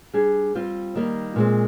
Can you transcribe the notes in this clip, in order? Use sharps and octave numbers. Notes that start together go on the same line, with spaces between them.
G3 D4 G#4
G3 C4 F4 C5
D#3 G3 A#3
A#2 G#3 C4